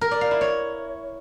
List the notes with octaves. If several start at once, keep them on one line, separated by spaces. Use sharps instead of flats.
A#4
D5
F5
E4
C#5